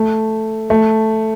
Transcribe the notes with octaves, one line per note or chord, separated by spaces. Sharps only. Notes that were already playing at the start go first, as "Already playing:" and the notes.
Already playing: A3
A3